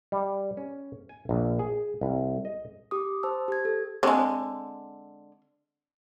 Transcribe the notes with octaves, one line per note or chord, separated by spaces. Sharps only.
G3
C#4
G#5
A#1
G#4
C2
D#5
G4 D6 D#6
C5 A5 E6
G4 G#6
A4
D3 G#3 C4 C#5